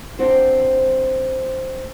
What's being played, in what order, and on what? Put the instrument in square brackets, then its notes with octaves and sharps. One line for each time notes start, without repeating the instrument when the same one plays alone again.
[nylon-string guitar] C4 D4 F#4 C5